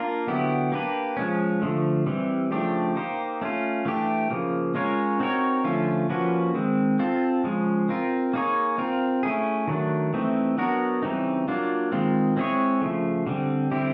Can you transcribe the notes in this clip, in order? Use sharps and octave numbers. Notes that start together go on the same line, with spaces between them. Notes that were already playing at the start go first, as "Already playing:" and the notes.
Already playing: A#3 D4 F4 A#4
D3 F#3 B3 E4 G4
A#3 D4 G4 B4
F3 G#3 C#4
D3 F3 A3
E3 G3 C4
C#3 F3 A3 D4 G4
A#3 D#4 G4 C5
A3 C#4 F4
E3 A3 D4 G4
C#3 F3 A#3
G#3 C#4 F4 A#4 C#5
C4 D#4 F#4 A#4 C#5
D3 F3 A3 C#4 F4
F3 A#3 C#4 F#4 B4
D#3 G#3 C4
C4 F4 A4
C#3 F3 G#3
C4 F4 A#4
A#3 D#4 G#4 C#5
C4 F4 A#4
A3 C#4 E4 G#4
D#3 F#3 A3 D4
E3 A3 C4 D#4
F#3 B3 D4 F#4 A#4
C#3 E3 G3 C4 D#4
F#3 A#3 D4 F4
D#3 G#3 C4 F4
G#3 C4 E4 G#4 C#5
C#3 F3 A3
D3 G3 C4
D3 G3 C4 E4 G4